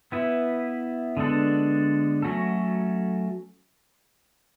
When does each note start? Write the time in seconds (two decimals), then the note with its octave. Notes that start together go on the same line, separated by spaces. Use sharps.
0.12 B3 E4 B4
1.17 D3 G#3 B3 D4 A4
2.22 F#3 A3 C#4 F#4 A4